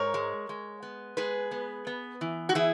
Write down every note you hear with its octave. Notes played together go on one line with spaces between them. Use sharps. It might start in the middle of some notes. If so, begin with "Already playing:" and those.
Already playing: G#2 A#4 C#5
G#3
G#3
B3
G#3 G#4 B4
B3
B3
E3
F#4
E3 E4 G#4